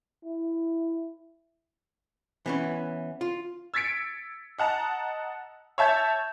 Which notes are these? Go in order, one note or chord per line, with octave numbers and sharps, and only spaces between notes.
E4
E3 B3 C#4
F4
E6 G#6 A6 B6 C#7 D7
D#5 F#5 A5 A#5
C#5 E5 A5 G6 G#6